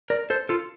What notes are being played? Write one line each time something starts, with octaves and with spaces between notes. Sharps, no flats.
A#4 D5
A4 C5
F4 A4